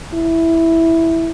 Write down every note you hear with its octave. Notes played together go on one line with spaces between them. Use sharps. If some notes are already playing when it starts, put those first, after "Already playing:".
E4